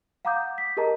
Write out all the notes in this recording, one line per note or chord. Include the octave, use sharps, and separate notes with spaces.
F5 F#5 A#5 D6 D#6 G6
B6
G4 G#4 A#4 D#5 A5 A#5